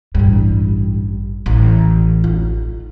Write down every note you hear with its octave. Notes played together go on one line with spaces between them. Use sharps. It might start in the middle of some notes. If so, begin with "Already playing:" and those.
A1 G2
A1
F4